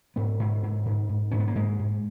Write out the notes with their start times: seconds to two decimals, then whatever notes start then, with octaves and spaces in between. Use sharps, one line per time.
0.16 G#2 B3
0.40 G#2
0.63 G#2
0.86 G#2
1.09 G#2
1.31 G#2 C#4
1.40 B3
1.48 A#3
1.55 G#2 G#3
1.79 G#2